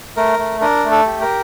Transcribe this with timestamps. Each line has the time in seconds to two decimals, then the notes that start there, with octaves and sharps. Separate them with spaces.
0.17 A3 A#4
0.39 A3
0.61 D4 A#4
0.85 A3
0.91 A4
1.06 G4
1.21 A#4